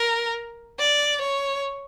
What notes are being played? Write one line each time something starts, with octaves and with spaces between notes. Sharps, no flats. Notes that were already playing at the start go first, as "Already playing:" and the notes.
Already playing: A#4
D5
C#5